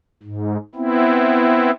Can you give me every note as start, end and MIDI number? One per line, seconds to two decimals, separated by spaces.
0.23 0.57 44
0.75 1.71 59
0.75 1.71 60
0.75 1.71 64